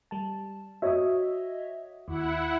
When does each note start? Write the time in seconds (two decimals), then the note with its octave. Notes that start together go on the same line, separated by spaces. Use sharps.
0.11 G3 A5
0.82 F#4 C#5 D#5 E5 D#6
2.08 D#2 E4 F#5